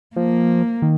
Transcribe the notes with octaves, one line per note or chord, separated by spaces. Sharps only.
F3 A#3
D#3